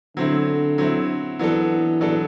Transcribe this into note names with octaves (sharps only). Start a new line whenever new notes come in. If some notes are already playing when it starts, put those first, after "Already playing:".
D3 F#3 C4 E4
F#3 C4 E4
E3 F#3 B3 D4 A4
F#3 B3 D4 A4